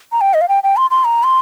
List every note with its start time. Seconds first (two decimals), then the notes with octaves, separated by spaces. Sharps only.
0.12 A#5
0.21 G5
0.34 D#5
0.41 F5
0.48 G5
0.63 G5
0.77 C6
0.91 C6
1.05 A#5
1.23 C6